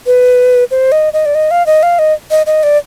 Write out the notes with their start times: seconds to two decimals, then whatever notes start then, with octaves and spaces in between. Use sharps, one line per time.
0.07 B4
0.71 C5
0.92 D#5
1.13 D#5
1.26 D5
1.35 D#5
1.51 F5
1.66 D#5
1.83 F5
1.99 D#5
2.31 D#5
2.46 D#5
2.63 D5